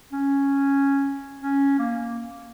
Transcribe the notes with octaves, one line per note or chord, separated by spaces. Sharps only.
C#4
C#4
A#3